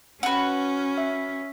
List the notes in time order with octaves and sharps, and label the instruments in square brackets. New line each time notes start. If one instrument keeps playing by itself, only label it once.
[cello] C#4 [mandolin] F#4 B4
[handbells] E5